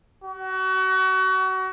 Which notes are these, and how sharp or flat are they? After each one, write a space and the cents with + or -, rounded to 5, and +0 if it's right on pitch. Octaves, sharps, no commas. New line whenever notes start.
F#4 +30